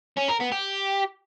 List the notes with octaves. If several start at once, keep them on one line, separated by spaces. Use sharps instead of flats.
C#4
A#4
B3
G4